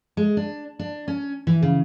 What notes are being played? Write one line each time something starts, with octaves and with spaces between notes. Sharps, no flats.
G#3
D4
D4
C#4
E3
C#3